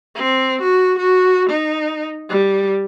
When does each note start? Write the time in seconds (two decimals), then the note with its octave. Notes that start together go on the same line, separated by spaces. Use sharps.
0.16 C4
0.61 F#4
0.98 F#4
1.50 D#4
2.29 G3